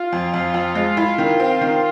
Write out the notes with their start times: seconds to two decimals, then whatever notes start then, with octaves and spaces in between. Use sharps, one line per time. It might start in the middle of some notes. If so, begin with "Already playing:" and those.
Already playing: F4
0.12 F2
0.34 F2
0.54 F2
0.75 G#3
0.97 E4
1.18 D#3
1.40 C4
1.61 D#3